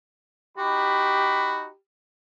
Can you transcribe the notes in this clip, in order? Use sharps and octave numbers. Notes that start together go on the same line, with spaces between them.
D#4 F#4 G4 B5